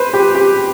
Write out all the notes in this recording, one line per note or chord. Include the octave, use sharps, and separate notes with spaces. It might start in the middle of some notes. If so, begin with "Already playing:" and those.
Already playing: B4 C5
G4
G4